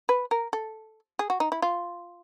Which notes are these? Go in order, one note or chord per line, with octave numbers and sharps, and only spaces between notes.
B4
A#4
A4
G#4
F#4
D#4
E4
F4